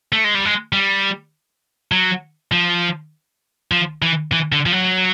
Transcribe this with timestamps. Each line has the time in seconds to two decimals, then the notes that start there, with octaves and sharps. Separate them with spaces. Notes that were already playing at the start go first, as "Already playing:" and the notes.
0.12 A3
0.24 G#3
0.35 G3
0.45 G#3
0.73 G3
1.92 F#3
2.52 F3
3.72 F3
4.02 E3
4.32 E3
4.52 D3
4.66 F3
4.72 F#3